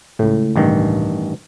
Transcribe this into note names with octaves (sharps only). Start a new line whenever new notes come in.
C#2 A2
A1 G2 D#3